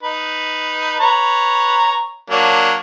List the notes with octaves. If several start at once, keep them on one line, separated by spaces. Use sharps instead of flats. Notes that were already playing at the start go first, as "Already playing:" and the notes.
D#4 B4
B4 C#5 A#5
F#3 A#3 D4